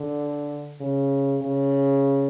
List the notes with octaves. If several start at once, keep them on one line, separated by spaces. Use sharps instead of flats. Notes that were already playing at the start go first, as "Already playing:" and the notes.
Already playing: D3
C#3
C#3